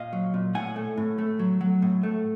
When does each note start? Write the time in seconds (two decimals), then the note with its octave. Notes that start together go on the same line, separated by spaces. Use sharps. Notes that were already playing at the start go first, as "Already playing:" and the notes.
Already playing: A#2 D#5 F5
0.13 F#3
0.34 A#2
0.54 A2 F#5 G#5
0.76 A3
0.97 A2
1.18 A3
1.39 F#3
1.61 F#3
1.82 A2
2.03 A3